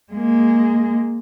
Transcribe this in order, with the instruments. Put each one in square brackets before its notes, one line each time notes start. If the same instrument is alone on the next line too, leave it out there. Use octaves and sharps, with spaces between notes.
[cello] G#3 A#3